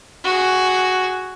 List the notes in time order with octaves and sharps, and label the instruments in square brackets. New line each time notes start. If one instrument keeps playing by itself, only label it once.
[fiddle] F#4 G#4